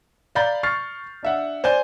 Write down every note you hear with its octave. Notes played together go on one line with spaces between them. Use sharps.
D5 F5 A#5 B5 G6 A6
C#6 F6 A6 C7
D4 E5 F#5
C5 D5 G#5 G6